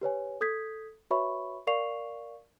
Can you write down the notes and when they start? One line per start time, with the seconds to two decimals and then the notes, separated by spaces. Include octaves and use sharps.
0.01 G4 B4 C#5 G#5
0.41 A4 D#6 G6 G#6 B6
1.11 F#4 B4 C#5 E5 B5 C#6
1.67 A#4 D5 F5 C#6 C7 F7